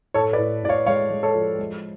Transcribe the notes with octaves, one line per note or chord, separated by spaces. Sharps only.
A2 A4 C#5
B4 D5
A2
A2 D5
C#5 F5
G#3 C#5 F5
G#3
A4 C#5
F3
G#3